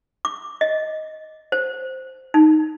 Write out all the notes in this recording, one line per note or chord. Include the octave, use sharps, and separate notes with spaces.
D6
D#5
C5
D#4